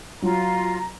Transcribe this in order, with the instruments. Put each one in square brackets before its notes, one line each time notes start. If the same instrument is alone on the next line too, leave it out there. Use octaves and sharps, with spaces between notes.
[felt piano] F#3 [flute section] F4 [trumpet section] A#5